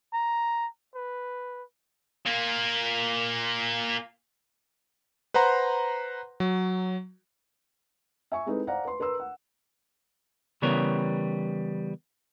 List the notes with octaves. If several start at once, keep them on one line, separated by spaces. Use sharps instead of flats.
A#5
B4
A#2 A#3
B4 C5 F#5 A#5 C6
F#3
E5 G#5 C#6
G#3 C4 D#4 E4 A4 B4
C5 D5 F5 F#5 A#5
B4 C6
A#4 B4 A#5 C6 E6
F#5
C#3 E3 G3 B3 A#4 C#5